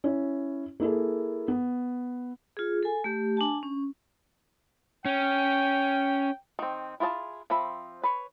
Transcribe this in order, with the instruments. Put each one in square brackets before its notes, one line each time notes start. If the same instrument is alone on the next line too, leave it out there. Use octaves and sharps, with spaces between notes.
[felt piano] C#4 E4
A#3 E4 G#4 A4
B3
[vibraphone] F4 G#4
A4 G#5
A3 G4
D4 G#5 A5
C#4
[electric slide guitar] C#4 [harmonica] G5
[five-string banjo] D#3 C4
E4 F4 G#4 D5 A5
F3 C4 E5 B5
B4 C#5